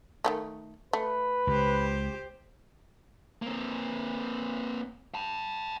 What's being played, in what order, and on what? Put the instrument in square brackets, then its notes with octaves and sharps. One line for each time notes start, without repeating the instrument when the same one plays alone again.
[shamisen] D#3 G3 A3
[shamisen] A3 [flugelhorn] B4
[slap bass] C#2 [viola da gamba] G4 C5
[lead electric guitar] A#3 C4
G5 A5